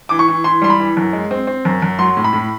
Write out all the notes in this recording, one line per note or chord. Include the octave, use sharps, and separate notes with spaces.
E3 D6
C#6
E3
E3 C6
G3 C6
B5
E3
F#2
G#3
C4
C4
F#2
F#2
F#3 C6
A2
B5
A2